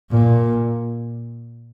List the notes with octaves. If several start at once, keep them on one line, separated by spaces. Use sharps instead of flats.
A#2